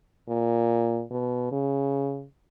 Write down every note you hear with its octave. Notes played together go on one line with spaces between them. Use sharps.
A#2
B2
C#3